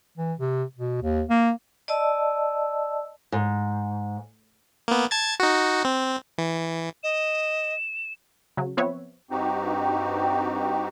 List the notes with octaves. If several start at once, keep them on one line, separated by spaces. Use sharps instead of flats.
E3
C3
B2
D#2
A#3
D5 D#5 A5 E6
G#2
A#3 B3
A5 G#6 A6
D#4 F#4
C4
E3
D#5 E7
C#3 F#3
F3 B3 C4 B4 C#5 E5
G2 C4 D#4 F#4 G4